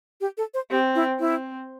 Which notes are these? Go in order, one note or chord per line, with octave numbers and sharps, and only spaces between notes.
G4
A4
C5
C4 G4
E4
C4 E4